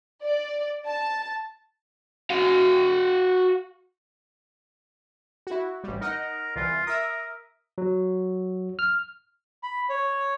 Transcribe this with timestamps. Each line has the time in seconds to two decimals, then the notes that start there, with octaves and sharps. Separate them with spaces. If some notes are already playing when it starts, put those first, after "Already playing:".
0.23 D5
0.87 A5
2.30 F#4 F5
5.47 E4 F#4
5.84 A1 G3
6.01 D#4 A#4 D#5 F#5
6.56 C2 E3 F4
6.87 A#4 E5 D#6
7.78 F#3
8.79 F6
9.63 B5
9.90 C#5